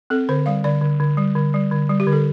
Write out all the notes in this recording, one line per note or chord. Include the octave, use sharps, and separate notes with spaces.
C4 A4
D3 C5
G3 F5
D3 D5
D3
D3
G3
D3
G3
D3
G3
G4
D3
A4